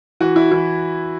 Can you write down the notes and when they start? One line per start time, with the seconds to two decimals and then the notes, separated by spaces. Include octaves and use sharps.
0.20 E3 F#4
0.36 E4
0.52 E3 E4